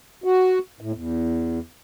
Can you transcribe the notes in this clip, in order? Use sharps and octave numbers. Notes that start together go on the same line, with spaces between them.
F#4
A2
E2